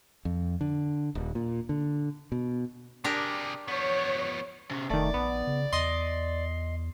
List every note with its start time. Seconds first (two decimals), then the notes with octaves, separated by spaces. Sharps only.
0.25 F2
0.61 D3
1.15 D#1
1.35 A#2
1.69 D3
2.32 B2
3.04 C3 D4 G4 G#4 A#4
3.68 F3 B3 C#5
4.71 C3 C#4
4.90 F1 D#3 A3 D5
5.14 A#1 B3
5.47 C#3
5.72 E2 D#5 C6